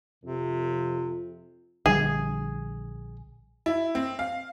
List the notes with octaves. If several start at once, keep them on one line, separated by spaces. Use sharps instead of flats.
F2 C3
A#1 D3 G3 G#4
E4
C4
F5